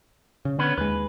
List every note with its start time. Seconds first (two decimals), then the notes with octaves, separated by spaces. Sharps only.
0.45 C#3
0.59 D3 B3 C#4 B4
0.78 D#2 G#3 B4